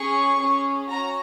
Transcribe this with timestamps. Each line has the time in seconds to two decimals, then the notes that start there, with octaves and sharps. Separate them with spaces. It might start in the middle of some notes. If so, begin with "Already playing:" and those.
Already playing: C#4 G#4 C#6
0.39 C#4 G#4
0.89 C#4 F#4 A#5